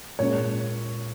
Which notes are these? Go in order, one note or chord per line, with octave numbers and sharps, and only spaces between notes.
A#2 G#3 C#4 C#5